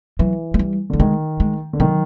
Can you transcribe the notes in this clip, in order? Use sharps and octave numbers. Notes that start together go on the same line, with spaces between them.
E3 F#3
G#3
G3
D3 G3
D#3 G#3
G#3
D3
D#3 F#3